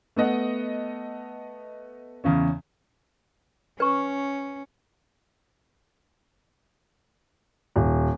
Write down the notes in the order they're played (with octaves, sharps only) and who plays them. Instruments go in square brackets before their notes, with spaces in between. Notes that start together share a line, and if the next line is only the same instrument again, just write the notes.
[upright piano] A3 B3 D#5 F#5
E2 C#3 C#4
[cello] C#4 [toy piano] B4 C#6
[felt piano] D#1